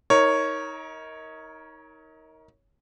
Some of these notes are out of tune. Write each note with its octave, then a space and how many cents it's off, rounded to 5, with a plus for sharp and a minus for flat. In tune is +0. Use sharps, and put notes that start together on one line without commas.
D#4 +30 A#4 +0 C#5 +0